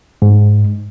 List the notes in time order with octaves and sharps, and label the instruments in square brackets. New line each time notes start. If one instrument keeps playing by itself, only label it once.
[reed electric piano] G#2